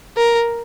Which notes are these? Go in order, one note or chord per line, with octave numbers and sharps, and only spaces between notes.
A#4